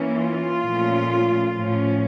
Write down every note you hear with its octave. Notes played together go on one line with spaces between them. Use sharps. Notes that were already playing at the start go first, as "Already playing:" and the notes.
Already playing: E3 A#3 C#4
F4
A#2 F3 A3 C#4
A2 F3 C#4